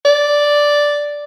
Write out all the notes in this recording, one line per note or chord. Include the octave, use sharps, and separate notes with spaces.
D5